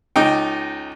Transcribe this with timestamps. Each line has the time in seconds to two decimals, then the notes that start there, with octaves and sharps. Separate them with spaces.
0.16 C#2 D#4 G5